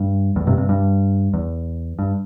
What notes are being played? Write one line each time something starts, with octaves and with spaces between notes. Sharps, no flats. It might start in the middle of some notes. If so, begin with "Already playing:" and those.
Already playing: G2
E2 A2
G2 C3
G2 C3
G2
E2
G2